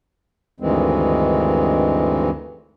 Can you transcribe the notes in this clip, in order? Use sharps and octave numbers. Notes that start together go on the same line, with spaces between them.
D2 G2 D#3 E3 G#3 C4